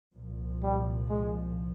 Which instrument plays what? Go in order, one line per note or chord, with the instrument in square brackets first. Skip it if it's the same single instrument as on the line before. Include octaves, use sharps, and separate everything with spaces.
[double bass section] C2 A#2 F3
[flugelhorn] G3
G#3